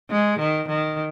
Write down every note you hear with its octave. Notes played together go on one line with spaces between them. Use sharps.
G#3
D#3
D#3